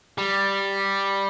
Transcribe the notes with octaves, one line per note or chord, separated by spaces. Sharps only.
G3